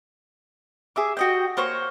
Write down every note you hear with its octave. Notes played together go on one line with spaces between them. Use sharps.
G#4 E5 D6
F#4 D#5 G5
A#3 C5 C#5 C#6